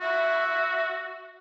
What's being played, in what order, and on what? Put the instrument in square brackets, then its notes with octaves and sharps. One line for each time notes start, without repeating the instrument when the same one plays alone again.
[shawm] F#4 [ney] E5